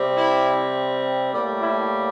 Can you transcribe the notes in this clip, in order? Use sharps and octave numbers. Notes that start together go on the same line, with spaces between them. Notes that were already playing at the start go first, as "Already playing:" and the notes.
Already playing: C3 G3 C4
E4
A2 G3 A#3
E4